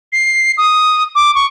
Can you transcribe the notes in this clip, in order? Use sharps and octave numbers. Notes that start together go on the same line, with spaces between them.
C7
D#6
D6
C#6